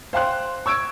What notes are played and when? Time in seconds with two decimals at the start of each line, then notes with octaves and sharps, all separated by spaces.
0.13 C5 F5 G5 C6 F#6
0.66 C#6 E6 G#6 D7